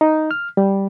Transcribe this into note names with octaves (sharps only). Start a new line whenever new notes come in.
D#4
F6
G3